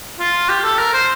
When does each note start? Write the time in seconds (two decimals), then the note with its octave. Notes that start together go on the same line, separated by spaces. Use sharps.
0.20 F4
0.49 G4
0.64 A4
0.78 A#4
0.93 C5